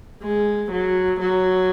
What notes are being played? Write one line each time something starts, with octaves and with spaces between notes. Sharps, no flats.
G#3
F#3
F#3